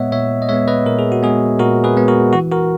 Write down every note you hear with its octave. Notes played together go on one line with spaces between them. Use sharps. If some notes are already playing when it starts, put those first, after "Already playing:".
Already playing: A#2 G#3 B3 C#5 D#5 E5 F#5
A#2 C#5 E5
D#5
G#3 B3 C#5 E5
B4 D#5
A#2 A#4
G#4
F#4
G#3 B3 G#4
A#2 F#4 A#4
G#4 B4
G#3 B3
F#4 A#4
E3 F#4
F#4 A#4